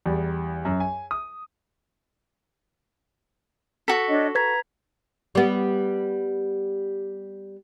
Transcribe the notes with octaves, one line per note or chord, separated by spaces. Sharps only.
E2 G3 D5
F#2
G#5
D#6
F#4 A4 B6
D4 C#5 D#5
B4 A#5 G#6 B6
G3 B3